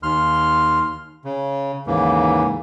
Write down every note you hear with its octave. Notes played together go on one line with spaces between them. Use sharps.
D#2 C6 F6
C#3
D#2 G#2 C#3 E3 A#3